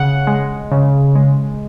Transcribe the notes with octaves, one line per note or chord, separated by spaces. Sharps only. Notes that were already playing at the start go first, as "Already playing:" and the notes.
Already playing: C#3 F#5
G#3
C#3
G#3